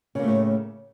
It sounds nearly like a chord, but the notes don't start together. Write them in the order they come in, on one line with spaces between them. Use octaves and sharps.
C#3 A#3 A3 A2